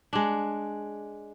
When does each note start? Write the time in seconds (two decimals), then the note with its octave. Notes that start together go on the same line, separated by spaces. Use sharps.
0.13 G#3 D4